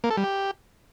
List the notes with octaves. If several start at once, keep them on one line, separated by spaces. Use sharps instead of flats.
A#3
A4
G3
G4